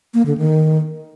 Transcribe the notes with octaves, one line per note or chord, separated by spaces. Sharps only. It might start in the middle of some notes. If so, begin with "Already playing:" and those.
A#3
D3
D#3